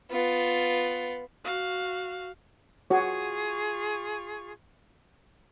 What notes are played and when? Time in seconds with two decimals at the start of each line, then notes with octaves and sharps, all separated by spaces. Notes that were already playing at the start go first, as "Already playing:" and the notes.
0.11 B3 F4
1.44 F#4 F5
2.90 F4 F#4 G#4 C#5 C#6